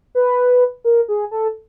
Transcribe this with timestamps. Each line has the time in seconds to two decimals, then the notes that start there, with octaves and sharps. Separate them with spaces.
0.15 B4
0.84 A#4
1.08 G#4
1.31 A4